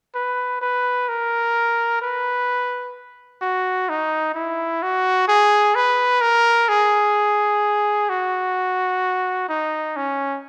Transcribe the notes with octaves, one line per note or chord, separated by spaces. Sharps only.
B4
B4
A#4
B4
F#4
D#4
E4
F#4
G#4
B4
A#4
G#4
F#4
D#4
C#4